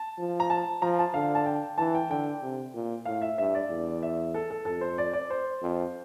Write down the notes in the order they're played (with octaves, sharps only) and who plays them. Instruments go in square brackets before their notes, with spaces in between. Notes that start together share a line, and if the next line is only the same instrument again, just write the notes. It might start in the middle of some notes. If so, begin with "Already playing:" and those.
Already playing: [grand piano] A5
[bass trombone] F3
[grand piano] A#5
A5
[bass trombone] F3 [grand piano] A#5
[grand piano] A5
[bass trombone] D3 [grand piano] F5
[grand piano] A5
G5
[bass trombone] E3 [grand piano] A5
[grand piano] G5
[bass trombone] D3 [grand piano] G5
[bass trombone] C3
A#2
[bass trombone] A2 [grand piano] F5
[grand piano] E5
[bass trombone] G2 [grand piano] E5
[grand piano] D5
[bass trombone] E2
[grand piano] E5
A4
A4
[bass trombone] F2 [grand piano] A4
[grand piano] C5
D5
D5
C5
[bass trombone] F2